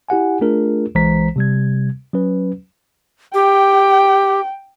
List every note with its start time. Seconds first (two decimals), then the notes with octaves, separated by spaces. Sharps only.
0.09 E4 G4 F#5 G#5
0.41 A3 D4 F4 G#4 A#4
0.95 B1 E3 G#3 C5 A#5 B6
1.36 C3 G3 G#6
2.13 F#3 C#4 B4
3.34 G4 G5